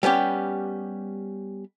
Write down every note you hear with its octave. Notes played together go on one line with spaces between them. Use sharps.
G3 B3 C#4 G4